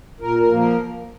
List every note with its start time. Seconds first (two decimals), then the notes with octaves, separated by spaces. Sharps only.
0.20 A#2 A#4
0.39 A#4
0.48 F3 A#3
0.57 A#4